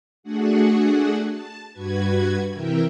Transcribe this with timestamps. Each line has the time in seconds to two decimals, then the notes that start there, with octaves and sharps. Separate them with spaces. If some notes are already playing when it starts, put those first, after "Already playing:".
0.23 A3 D4 F#4 G#4 F#5
1.27 A5
1.72 G2 F#4 B4 G#6
2.52 C3 E3 E4 A#4 E5 G5